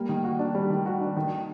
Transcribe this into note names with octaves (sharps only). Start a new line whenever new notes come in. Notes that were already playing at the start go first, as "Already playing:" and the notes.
Already playing: G3 A#3
D#3
F#4
D4
G3
D#3
F#4
D4
D#3